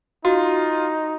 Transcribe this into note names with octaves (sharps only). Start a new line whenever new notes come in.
D#4 F4 F#4